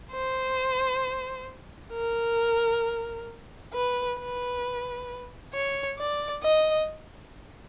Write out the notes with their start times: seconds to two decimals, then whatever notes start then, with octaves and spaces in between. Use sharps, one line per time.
0.12 C5
1.93 A#4
3.74 B4
4.19 B4
5.54 C#5
5.98 D5
6.43 D#5